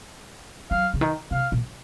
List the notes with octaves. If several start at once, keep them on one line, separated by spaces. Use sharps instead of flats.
F#3 F5
C#3
D#3
C3 F5
A#2